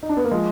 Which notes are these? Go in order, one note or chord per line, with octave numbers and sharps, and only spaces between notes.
D#4
D4
B3
A#3
F3 G#3